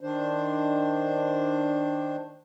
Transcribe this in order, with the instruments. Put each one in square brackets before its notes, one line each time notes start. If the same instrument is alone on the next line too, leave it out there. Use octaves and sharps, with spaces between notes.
[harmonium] D#3 D4 C5